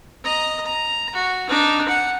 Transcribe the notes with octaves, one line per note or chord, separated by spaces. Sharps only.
D#5 A#5
A#5
F#4
D4 D#4
F#5